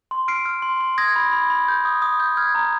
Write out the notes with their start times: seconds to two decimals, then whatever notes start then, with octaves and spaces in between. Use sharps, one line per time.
0.11 C6
0.28 F6 C7 D7
0.45 F6
0.62 C6
0.81 C6
0.98 D#6 G#6 A#6
1.16 B5
1.32 B5
1.50 B5
1.68 G6
1.85 D#6
2.02 D#6
2.20 G6
2.37 F6 G#6
2.55 A#5